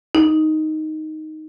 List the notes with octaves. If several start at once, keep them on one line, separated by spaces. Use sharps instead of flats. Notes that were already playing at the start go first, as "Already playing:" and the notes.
D#4